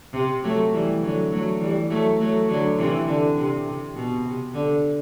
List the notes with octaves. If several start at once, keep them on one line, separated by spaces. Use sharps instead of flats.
C3
F#3 A3
E3 G3
D3 F#3
F#3 A3
E3 G3
F#3 A3
F#3 A3
D3 F#3
C3 E3
D3
C3
C3
B2
C3
D3